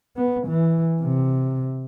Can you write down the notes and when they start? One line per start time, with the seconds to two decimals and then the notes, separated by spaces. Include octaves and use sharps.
0.16 B3
0.48 E3
1.03 C3